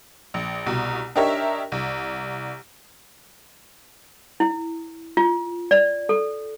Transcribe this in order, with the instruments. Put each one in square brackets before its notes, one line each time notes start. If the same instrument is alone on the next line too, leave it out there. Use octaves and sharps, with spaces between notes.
[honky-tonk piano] A#1
C2 B2
D4 D#4 G4 A#4 C#5 E5
C2
[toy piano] E4
F4
D5
A4